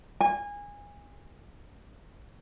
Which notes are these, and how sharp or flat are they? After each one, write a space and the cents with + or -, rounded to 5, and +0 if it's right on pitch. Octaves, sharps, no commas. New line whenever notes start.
G#5 -25